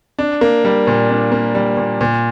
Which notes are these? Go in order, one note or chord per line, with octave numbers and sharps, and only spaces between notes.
D4
A#3
G3
A#2
D4
A#3
G3
A#2
A#2